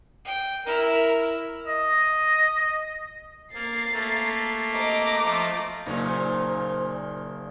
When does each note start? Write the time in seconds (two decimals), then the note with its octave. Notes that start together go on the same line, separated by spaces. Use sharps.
0.25 G5
0.66 E4 A#4
1.67 D#5
3.54 A#3 A#5 A6 C7
3.93 A3 A#3
4.73 D#5 A#5 D6
5.24 F3 A3
5.86 F#1 A#2 C#4 D#4 C5